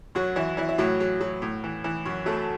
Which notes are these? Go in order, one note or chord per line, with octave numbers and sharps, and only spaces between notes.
F#2 F#3 F#4
E3 E4
E3 E4
E4
A2 F#3 F#4
F#3
F#3
A2
E3
E3
F#2
F#3 A3 A4